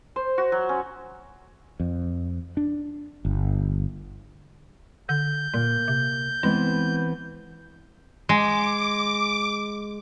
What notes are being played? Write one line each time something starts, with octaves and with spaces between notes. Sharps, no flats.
C5
F#4
F#3
C#4
F2
D4
G1
D3 G6
A#2 A#3
C3
E3 G#3 B3 C4
G#3 D6